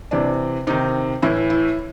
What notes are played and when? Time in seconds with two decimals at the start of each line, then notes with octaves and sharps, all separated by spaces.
0.11 C3 E3 D4
0.67 C3 D#3 D#4
1.22 A2 E3 E4
1.50 E4